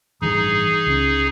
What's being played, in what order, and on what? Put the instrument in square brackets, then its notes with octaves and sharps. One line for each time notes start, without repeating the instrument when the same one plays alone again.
[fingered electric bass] A1 G2 E3 [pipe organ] D#4 G#4
[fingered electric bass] C#2 C#4